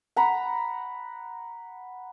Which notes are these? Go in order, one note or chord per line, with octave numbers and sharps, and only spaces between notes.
F#5 A#5 B5